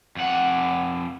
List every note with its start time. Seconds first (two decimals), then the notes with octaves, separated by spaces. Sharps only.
0.16 F2 F#5